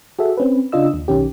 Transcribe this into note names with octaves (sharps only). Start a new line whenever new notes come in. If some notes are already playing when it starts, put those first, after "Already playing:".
F#4 G#4 A4 E5
C4 C#4 B4
C#3 D4 F4 D#5 E6
D#2
B1 D#3 C#4 G4